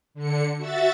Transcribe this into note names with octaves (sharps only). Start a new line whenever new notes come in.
D3 C#7
F#4 E5 A6